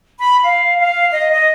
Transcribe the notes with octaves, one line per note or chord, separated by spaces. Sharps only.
B5
F5
F5
D#5
D#5